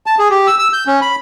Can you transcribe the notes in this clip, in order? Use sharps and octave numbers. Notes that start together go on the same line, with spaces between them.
A5
G#4
G4
E6
E6
G6
C#4
B5